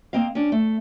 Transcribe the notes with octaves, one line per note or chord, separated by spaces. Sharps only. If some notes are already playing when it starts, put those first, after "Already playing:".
A#3 C4 D#5 F5
C#4 D4
A3